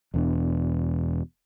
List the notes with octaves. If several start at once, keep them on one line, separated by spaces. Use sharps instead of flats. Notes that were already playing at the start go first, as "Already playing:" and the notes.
E1 E2 B2 D4